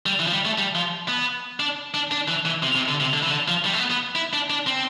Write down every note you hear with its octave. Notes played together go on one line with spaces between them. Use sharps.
G3
E3
F3
G3
A3
G3
F3
B3
D4
D4
D4
E3
E3
C3
C3
D3
C3
D3
E3
D3
F3
G3
A3
B3
B3
E4
D4
D4
C4